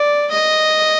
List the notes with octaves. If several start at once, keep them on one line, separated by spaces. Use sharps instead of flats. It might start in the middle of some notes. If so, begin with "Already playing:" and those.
Already playing: D5
D#5